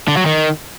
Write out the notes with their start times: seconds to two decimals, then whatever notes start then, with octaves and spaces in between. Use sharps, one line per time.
0.08 D3
0.17 F#3
0.26 D#3